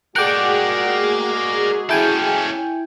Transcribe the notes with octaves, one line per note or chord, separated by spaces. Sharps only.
G#3 F#4 G#4 A#4 D5 F#5 G5 D6
C#4 E4 A4 G5 G#5